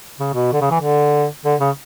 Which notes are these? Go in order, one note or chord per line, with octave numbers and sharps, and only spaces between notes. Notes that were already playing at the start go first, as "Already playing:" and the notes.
C#3
B2
D3
C#3
E3
D3
D3
C#3